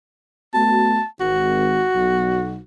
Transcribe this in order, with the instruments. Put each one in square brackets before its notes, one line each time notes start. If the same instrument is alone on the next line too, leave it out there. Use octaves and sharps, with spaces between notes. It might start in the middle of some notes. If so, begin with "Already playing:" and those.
[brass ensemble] A3 B3 F#4 [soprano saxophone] A5
[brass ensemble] G#1 [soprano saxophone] F#4
[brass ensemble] B1